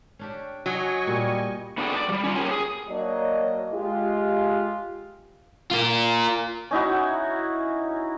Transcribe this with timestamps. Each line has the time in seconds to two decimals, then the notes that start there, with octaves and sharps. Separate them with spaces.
0.19 C#4 D4 G4
0.66 F#3 D#5 G#5 C#6
1.07 A#2 G3
1.78 B3 D4 F#4 G#4 A4 G5
1.96 D5
2.09 F3 G3
2.24 C#4 F4
2.36 G4 A#4 C#5 G5 G#5
2.51 G#4
2.89 F#3 A#3 D4 C#5 D#5
3.72 G#3 F4 G4
5.71 F4 A#4
6.71 C#4 D#4 E4 F#4